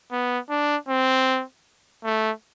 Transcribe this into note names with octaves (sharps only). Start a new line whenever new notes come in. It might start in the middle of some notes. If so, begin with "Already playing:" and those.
B3
D4
C4
A3